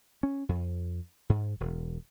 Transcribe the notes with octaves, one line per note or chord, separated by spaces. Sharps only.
C#4
F2
G#2
E1